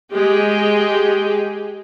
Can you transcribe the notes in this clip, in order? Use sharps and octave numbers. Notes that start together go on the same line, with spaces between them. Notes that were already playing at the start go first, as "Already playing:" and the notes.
G#3 G4